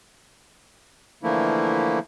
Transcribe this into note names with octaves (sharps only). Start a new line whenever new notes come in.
D3 E3 F3 A3 A#3 E4